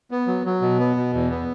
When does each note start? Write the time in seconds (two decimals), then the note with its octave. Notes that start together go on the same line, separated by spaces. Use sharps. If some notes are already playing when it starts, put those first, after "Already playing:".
0.11 B3
0.27 F#3
0.46 F#3
0.61 B2
0.79 B3
0.96 B2
1.14 E2
1.30 B3